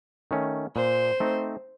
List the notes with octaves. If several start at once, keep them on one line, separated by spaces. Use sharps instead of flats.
D#3 A3 C#4
A#2 C5
A3 C4 D#4